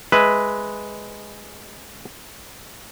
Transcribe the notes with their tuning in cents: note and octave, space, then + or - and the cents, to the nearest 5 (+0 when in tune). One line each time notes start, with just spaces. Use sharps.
G#3 +0 B4 +0 E5 +0